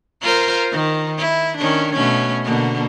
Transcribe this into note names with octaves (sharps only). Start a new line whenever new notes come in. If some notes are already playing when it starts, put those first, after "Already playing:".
F4 A#4 C5
D#3
E4
D#3 C#4 D4
B2 A3 C#4
B2 D3 A#3